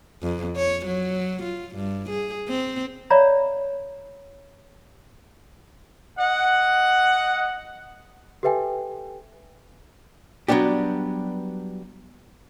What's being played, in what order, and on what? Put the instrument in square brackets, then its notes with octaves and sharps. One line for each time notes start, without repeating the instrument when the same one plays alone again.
[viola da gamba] F2
C#5
F#3
F4
G2
G#4
C4
[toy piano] C#5 D5 E5 F5 A#5 B5
[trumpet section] D#5 F#5
[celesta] G4 A4 B4 E5 G5 G#5
[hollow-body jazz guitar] F#3 G3 B3 D4 G4